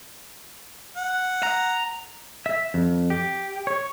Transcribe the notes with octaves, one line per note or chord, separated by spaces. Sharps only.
F#5
A#5
E5
F2
G4
C#5